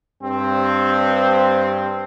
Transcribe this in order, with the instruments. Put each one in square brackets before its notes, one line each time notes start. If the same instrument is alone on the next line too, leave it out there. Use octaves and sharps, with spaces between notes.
[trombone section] G2 C4